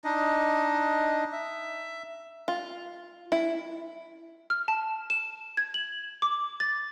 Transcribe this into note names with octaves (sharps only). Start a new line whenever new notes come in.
D4 D#4 D#5
E5
F4
E4
F6
A5
E7
G#6
F#7
D6
A6